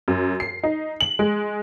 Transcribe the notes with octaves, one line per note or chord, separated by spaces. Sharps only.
F#2
C7
D#4
F#7
G#3